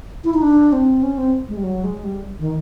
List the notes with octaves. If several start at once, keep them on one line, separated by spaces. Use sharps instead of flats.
E4
D#4
D4
C4
C#4
C4
G#3
G3
F#3
G#3
G3
D#3